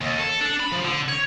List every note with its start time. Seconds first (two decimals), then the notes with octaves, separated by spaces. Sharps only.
0.01 D#2
0.18 A4
0.41 D4
0.60 B5
0.72 F3
0.84 D3
1.08 C#5